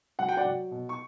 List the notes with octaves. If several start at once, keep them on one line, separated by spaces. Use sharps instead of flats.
F#3 F#5
G5
D5 F#5
F#3
B2
C#6